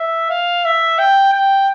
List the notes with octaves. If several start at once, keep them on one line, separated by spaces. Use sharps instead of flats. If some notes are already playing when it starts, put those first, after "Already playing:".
Already playing: E5
F5
E5
G5
G5